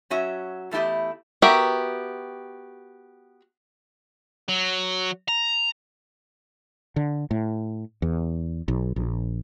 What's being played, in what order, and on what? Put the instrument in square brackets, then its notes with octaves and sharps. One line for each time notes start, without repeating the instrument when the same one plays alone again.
[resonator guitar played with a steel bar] F#3 C#4 F#4 E5
E2 A3 E4 G4 D#5
[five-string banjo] B3 F#4 G4 A#4 E5
[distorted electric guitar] F#3
A#5
[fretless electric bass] D3
A2
E2
B1
A#1